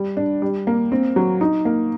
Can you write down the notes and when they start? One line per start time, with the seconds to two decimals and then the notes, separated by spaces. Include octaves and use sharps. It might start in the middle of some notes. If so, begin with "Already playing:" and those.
Already playing: G3
0.17 D4
0.42 G3
0.67 A#3
0.92 C4
1.16 F#3
1.41 D#4
1.65 A#3